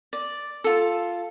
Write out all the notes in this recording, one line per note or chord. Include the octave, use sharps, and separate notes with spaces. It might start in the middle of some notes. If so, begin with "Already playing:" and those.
D5
F4 A4